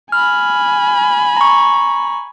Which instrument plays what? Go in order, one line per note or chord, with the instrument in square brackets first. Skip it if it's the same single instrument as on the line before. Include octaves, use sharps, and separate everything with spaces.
[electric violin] G#5 B5 [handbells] F6
[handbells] A#5 C#6